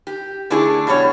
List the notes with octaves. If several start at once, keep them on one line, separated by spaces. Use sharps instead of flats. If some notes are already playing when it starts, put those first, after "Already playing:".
G4
D3 A3 D4 E4 G#4
B2 F#3 G3 A4 C#5